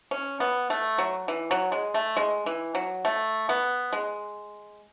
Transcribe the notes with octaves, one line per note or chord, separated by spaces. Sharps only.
C#4
B3
A3
F#3
E3
F#3
G#3
A3
G#3
E3
F#3
A3
B3
G#3